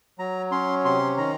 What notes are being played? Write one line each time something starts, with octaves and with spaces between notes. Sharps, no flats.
F#3 A#5
C#4 C6
C3 C6
D#3 A#5